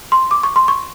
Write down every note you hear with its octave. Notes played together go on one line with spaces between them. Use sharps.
C6
D6
C#6
C6
C#6